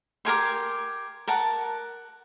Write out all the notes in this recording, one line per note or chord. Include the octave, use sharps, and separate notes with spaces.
G4 A#4 G#5 C6
A#4 F#5 A5